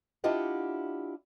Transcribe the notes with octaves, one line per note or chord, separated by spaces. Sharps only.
D4 E4 F4 G4 D#5 F#5